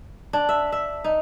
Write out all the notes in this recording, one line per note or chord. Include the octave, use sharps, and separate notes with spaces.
D4
E5
E5
D#4